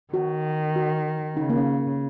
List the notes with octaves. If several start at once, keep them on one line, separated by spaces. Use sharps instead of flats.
D#3 F#4
F#4
C#3 D#4
A#3
C#4